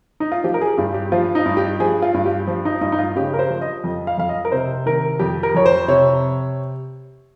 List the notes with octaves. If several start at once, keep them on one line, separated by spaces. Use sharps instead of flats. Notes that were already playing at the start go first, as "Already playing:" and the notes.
D#4
F4
F3 G4
A#4
G#4
G2 G4
G4
F3 F4
D#4
G2
G4
F3 G#4
F4
G2
G4
F3
D#4
G2 D#4
D#4
F4
C#3 G4
A#4
C5
F3
D#5
F2
F5
F2 F5
D#5
A#4
C3 C5
D#3 A#4
F2 G4
A#4
F2 C#5
C5
C3 C#5